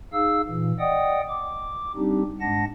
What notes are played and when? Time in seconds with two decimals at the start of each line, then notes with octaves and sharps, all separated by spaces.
0.13 D#4 G#4 F5 E6
0.47 A#2 E3
0.79 D5 D#5 F#5 G5 D#6
1.29 D6
1.96 G3 C4 D4 D#4 G4
2.41 G#2 G#3 D4 F#5 A5 A#6